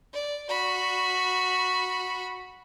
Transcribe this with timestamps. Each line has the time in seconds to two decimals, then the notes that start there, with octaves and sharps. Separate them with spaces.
0.13 D5
0.49 F#4 B5